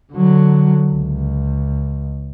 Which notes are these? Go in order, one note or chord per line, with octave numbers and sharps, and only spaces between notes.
D3 F#3
C#2